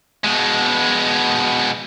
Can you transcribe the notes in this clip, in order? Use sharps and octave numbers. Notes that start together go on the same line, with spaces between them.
B2 G#3